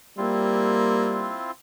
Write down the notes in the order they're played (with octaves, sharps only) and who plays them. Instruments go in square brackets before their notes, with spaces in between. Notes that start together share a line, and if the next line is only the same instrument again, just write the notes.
[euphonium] G3 [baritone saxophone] A#3 [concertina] C4 E4 F4